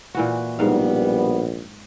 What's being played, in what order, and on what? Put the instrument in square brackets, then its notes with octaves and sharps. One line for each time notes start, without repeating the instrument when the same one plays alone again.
[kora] A#2 E3 F#4
[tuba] A#1 [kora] G#2 F5 [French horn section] B2 G3 B3